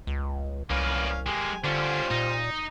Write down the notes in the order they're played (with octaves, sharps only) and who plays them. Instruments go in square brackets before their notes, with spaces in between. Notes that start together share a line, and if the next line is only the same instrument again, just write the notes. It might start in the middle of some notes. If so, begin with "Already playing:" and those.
[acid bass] C#2
[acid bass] C2 [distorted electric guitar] A#3 B4 [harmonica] C#4 F5 D6
[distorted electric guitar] G#3 A#3 [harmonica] G4 G#5
[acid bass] D3 [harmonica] G3 F4 C5 [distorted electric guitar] C#4 D4
[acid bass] A#2 [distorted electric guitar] D#4